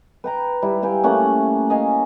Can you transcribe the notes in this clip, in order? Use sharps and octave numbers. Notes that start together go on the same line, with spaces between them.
B4 G5 A#5
G3 E4
E5 F5 G5 G#5
A3 A#3 C#4 F#5
D#5 F5 G#5